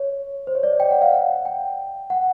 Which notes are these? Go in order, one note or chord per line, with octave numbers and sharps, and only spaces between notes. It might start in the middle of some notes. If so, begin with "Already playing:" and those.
Already playing: C#5
C5
C#5
D5
D#5
G5
F#5
F5
F#5
G5
F#5